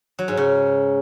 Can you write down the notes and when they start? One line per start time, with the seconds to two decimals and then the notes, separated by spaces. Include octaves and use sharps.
0.19 F#3
0.28 G#2
0.37 C#3